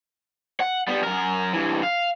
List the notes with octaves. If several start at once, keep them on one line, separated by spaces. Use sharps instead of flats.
F#5
G3 B3
F#2 A#4
G2 E3
F5